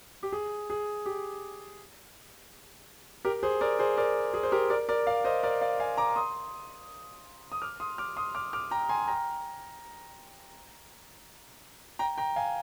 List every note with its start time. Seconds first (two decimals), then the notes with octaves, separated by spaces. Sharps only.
0.23 G4
0.33 G#4
0.70 G#4
1.06 G4
3.25 G4 A#4
3.43 G#4 C5
3.61 A#4 D5
3.79 G#4 C5
3.97 A#4 D5
4.34 G#4
4.43 C5
4.52 G4 A#4
4.70 A#4 D5
4.89 A#4 D5
5.07 D5 F5
5.24 C5 D#5
5.43 A#4 D5
5.61 D5 F5
5.80 F5 G#5
5.97 A#5 D6
6.16 C6 D#6
7.52 D#6
7.62 D6 F6
7.80 C6 D#6
7.98 D6 F6
8.17 C6 D#6
8.35 D6 F6
8.53 D6 F6
8.71 G5 A#5
8.89 G#5 C6
9.08 G5 A#5
11.99 G5 A#5
12.18 G5 A#5
12.36 F5 G#5